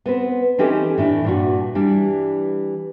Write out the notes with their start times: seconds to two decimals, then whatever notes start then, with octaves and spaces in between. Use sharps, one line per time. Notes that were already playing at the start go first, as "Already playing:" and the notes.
0.06 B3 C4 B4
0.58 E3 C4 C#4 D#4 G4 A4
0.98 A2 E3 D4
1.24 G2 A#2 F#4
1.75 E3 G3 D4